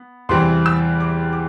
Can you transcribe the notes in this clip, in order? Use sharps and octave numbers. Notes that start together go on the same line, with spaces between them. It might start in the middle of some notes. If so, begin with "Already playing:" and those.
Already playing: B3
E2 C3 E3 G3 C4 C6
E6
D6
D6